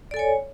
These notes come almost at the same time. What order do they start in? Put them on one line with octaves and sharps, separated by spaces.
D5 A4 G#5 C#5